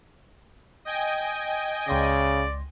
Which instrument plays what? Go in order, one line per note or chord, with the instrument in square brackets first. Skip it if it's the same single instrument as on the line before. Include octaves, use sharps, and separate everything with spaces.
[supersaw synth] D#5 G5 G#5
[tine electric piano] C#2 C6 A#6 [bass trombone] C#3 [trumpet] D5